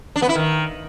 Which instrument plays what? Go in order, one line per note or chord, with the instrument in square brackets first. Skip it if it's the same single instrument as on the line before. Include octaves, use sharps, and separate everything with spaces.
[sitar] D4
B3
E4
D#3